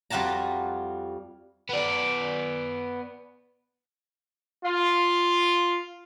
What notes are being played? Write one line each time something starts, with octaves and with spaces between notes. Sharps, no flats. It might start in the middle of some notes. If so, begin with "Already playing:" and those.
F2 G3 F4 F#4 A5 A#5
B3 D5
F4